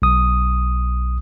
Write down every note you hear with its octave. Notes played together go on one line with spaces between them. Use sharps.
B1 D#6